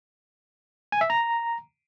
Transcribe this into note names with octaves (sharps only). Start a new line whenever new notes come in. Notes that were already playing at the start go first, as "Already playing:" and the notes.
G#5
E5
A#5